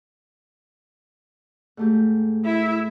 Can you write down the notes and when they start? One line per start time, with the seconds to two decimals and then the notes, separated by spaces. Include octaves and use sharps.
1.77 G#2 A3 G4
2.45 E4 E5